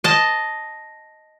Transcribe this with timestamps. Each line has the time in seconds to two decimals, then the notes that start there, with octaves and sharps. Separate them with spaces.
0.04 D#5 A5